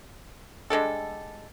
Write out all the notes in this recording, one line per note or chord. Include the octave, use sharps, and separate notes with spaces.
G3 G#3 D4 A4